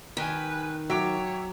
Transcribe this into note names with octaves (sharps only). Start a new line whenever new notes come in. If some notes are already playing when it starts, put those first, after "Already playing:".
D#3 G4 B4 G#5
F#3 C#5 E5 G5 D6